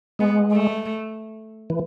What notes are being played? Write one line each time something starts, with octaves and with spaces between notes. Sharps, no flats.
G#3 B3
A3
E3